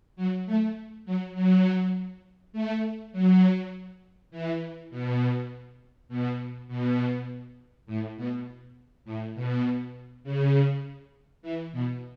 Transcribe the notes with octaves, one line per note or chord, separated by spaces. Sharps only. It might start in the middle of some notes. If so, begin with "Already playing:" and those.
F#3
A3
F#3
F#3
A3
F#3
E3
B2
B2
B2
A2
B2
A2
B2
C#3
E3
B2